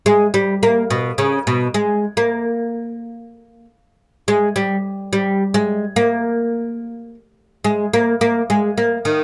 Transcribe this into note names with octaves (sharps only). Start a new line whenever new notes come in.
G#3
G3
A#3
B2
C#3
B2
G#3
A#3
G#3
G3
G3
G#3
A#3
G#3
A#3
A#3
G#3
A#3
D#3